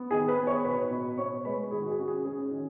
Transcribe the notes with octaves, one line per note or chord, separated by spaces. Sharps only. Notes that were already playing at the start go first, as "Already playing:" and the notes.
Already playing: B3
D#3 G#4 G#5
B4 B5
B3
C#5 C#6
B2 B4 B5
B2
B2 C#5 C#6
G#3 B4 B5
D#3 G#4
F#4
G#4
C#4 F#4
G#4
C#4 G#4
D#3